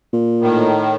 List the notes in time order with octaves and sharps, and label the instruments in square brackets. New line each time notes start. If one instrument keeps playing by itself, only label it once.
[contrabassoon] A#2
[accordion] A2 D#3